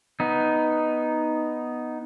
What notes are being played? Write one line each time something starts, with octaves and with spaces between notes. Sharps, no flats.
B3 D#4